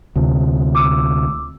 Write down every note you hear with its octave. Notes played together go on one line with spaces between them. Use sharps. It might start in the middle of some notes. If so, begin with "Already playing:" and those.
D2 C3
D6 E6